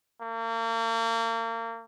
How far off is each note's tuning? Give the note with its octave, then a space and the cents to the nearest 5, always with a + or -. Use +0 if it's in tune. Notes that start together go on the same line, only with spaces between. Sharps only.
A#3 -35